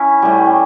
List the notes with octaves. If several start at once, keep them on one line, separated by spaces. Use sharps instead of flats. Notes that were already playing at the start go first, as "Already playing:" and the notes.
Already playing: C#4 E4
A2 G3